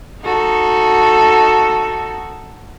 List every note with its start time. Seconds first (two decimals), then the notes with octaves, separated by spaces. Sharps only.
0.24 D#4 F#4 A4